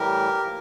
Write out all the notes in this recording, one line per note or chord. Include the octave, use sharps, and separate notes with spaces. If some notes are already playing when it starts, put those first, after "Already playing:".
Already playing: A2 E3 G3 G4 A#4
A2 F3 A#3